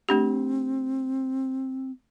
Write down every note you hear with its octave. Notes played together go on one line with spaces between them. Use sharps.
A3 C4 D4 G4